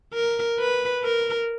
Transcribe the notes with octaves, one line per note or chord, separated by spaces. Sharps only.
A#4
B4
A#4